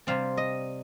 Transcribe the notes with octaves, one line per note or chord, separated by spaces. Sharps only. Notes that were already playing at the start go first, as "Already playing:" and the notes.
C3 G3 C4 F5
D#5